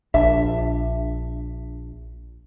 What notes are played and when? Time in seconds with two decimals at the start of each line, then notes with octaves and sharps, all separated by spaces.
0.14 A#1 D4 E5